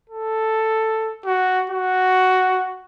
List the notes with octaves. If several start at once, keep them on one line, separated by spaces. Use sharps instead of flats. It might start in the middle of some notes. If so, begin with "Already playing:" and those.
A4
F#4
F#4